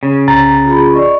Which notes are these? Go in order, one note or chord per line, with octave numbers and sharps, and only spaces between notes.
C#3
C2 A#5 A6
F4 G#4 B5
D5 D#5 C#6